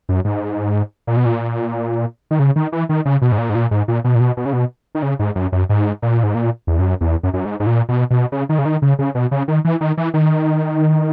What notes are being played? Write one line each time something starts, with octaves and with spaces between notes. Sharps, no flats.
F#2
G#2
A#2
B2
A#2
D#3
C#3
D#3
E3
D#3
C#3
B2
G#2
A#2
G#2
A#2
G#2
A#2
B2
A#2
B2
B2
C#3
B2
D#3
C#3
G#2
F#2
F#2
G#2
A#2
G#2
A#2
E2
F#2
E2
F#2
F#2
G#2
G#2
A#2
B2
B2
C#3
D#3
C#3
D#3
C#3
C#3
B2
C#3
D#3
E3
D#3
E3
D#3